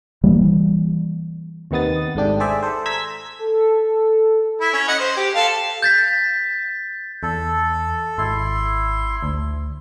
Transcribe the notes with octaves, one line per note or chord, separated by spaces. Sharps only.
E3 G3 A#3
D#2 C3 D#3 B3 D#6 A6
G#1 G#2 A3 D4 G4
G#4 C5 D5 E5
A4 C5
A#5 E6 G#6 B6
A4
E4
C#4
D#5 F#5
C5
G4
A4 F5
G6 A6 B6
E2 A4
G#1 E4 C6
D2